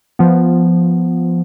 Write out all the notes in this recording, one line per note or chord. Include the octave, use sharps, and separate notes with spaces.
F3 B3